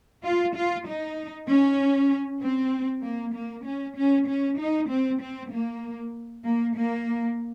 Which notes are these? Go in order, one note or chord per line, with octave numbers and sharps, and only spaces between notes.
F4
F4
D#4
C#4
C4
A#3
A#3
C#4
C#4
C#4
D#4
C4
C4
A#3
A#3
A#3